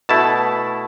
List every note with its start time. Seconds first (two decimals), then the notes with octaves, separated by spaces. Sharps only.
0.09 B2 A3 E4 A5